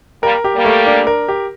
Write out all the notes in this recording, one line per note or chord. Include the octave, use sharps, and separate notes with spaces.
G3 A#3 A#4
G4
G3 A#3
A3
D4
A#4
G4